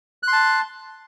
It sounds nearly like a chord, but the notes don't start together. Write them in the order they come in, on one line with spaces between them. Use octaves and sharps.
F#6 C6 A5